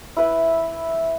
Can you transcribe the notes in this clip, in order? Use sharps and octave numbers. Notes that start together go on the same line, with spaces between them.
E4 B4 E5